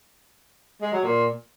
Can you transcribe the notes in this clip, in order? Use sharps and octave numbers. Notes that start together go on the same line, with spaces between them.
G#3
F#3
A#2